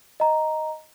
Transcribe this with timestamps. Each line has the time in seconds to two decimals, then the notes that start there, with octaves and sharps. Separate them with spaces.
0.20 D#5 A#5